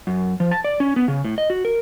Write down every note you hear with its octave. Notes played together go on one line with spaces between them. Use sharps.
F#2
F3
A5
D5
C#4
B3
C#3
A2
D#5
F#4
A#4